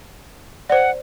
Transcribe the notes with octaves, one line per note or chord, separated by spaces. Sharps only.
C5 D5 F#5